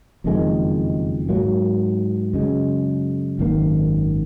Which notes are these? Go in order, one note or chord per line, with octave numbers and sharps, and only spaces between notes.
F#1 F2 D#3 G#3
G#2 F#3 A#3
F#2 C#3 G#3
G#1 F#2 D#3 A#3